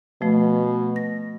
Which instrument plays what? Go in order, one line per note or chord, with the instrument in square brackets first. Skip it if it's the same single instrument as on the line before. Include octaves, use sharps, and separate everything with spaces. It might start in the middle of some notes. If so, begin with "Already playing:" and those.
[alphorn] B2 [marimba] F3 A3
[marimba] A#6